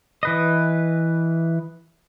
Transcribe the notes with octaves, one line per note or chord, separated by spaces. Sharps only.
E3 B4 D#5